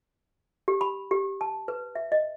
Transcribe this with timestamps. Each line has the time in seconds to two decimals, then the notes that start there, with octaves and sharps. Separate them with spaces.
0.68 G4
0.81 B5
1.11 G4
1.41 A5
1.68 B4
1.95 E5
2.12 D#5